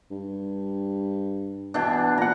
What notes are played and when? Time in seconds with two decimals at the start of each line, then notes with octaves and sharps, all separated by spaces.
0.11 G2
1.74 B2 E3 D4
2.18 A#2 F#5 A#5